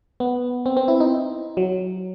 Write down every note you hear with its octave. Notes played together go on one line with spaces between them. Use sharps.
B3
C4
C4
E4
D#4
F#3